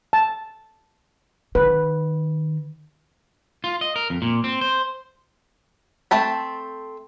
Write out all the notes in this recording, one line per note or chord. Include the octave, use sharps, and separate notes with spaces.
A5
D#3 B4
F4
D#5
A#4
F2
A#2
C4
C5
A3 C4 A5 B5